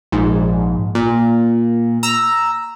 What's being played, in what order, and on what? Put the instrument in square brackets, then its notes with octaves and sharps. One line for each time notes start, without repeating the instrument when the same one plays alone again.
[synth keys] A#1 G#2
A#2
A#5 E6